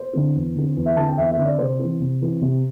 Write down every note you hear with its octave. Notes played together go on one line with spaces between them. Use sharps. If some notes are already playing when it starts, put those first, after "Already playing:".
Already playing: C5
D3 C4
E2
D3 C4
E2
E5
D3 C4 A5
G5
E2 E5
E5
D3 C4
D5
C3 C5
E3 C4
C3
E3 C4
C3